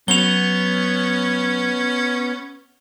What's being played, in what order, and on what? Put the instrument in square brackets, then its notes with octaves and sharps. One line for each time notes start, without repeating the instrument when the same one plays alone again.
[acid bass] F#3 [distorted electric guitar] B3 [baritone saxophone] C#4 [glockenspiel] F7 G7